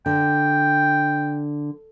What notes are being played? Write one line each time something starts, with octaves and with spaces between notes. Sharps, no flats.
D3 G5